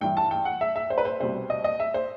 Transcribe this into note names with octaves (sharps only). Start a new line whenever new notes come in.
A1 G2 E3 G5
A5
G5
F#5
E5
E5
C5
B4
C5
C2 B2 G3 C5
D#5
D#5
E5
C5